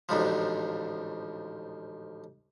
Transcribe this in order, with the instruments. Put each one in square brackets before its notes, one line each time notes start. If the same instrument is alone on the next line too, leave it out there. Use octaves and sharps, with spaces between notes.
[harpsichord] A1 D2 G#2 F3